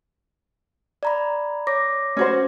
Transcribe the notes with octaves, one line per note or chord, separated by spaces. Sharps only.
D5 A#5 B5
C#5 D6 A#6
C#4 F#4 C5